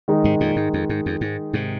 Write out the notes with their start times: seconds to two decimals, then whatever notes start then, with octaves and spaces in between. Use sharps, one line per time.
0.08 D#3 G#3 D#4
0.24 G#2 C3
0.40 F2 A#2
0.56 G#2
0.74 F2
0.89 G#2
1.06 F2
1.21 G#2
1.53 G#2 C3